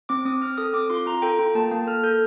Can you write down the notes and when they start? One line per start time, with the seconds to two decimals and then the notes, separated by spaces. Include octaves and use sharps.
0.09 C4 D6
0.25 C4 D#6
0.42 C4 F6
0.58 A4 D#6
0.74 C4 D6
0.90 F4 C6
1.06 F4 A#5
1.22 A4 G5
1.39 F4 G5
1.55 A#3 A5
1.71 A#3 A5
1.87 A4 F6
2.03 A4 G6